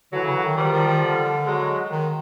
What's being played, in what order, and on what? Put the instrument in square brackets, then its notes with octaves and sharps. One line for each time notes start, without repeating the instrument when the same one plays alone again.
[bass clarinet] D3 [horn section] E3 F#3
[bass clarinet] C#3
D3
D#3
[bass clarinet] D#3 [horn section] F3 G3
[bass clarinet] D#3
D#3
D3
[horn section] F#3 G#3
[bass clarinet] D#3